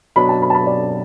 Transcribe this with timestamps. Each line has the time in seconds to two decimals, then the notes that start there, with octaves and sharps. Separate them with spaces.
0.16 B2 F#3 D4 B5
0.29 A5
0.42 B5
0.50 A5
0.54 B5
0.67 D5